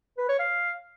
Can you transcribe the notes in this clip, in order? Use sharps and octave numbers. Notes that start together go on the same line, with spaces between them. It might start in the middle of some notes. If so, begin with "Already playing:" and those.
B4
C#5
F5